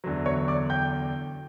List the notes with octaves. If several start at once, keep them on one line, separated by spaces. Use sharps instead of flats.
E2 D3 F#3
C#5 C#6
D5 D6
G5 G6